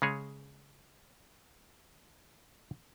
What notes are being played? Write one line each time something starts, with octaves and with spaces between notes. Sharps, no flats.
C#3 G#3 G#4 C#5